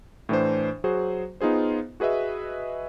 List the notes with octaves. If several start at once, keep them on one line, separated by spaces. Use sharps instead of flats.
A2 E3 D4 C5
F#3 F#4 G#4 C5
B3 D#4 F4 G#4 C5
F#4 G#4 B4 D#5 E5